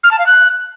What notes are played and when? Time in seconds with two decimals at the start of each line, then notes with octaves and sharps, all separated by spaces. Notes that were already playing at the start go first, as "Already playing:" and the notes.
0.04 F6
0.11 A5
0.19 F5
0.27 F#6